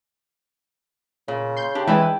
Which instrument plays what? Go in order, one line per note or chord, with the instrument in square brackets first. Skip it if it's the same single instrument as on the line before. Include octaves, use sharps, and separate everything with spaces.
[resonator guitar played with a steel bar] A#2 [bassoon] C#3
[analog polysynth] C6 G6
[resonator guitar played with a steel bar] D4 [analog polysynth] G4
[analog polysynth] E3 G#3 [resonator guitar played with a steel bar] E4 B4 D5 [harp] G5